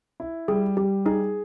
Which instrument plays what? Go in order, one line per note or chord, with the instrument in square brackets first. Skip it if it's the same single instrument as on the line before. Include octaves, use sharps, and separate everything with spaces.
[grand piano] E4
[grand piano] G3 [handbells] G#4
[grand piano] G3 [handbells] G4
[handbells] D#4 [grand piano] G#4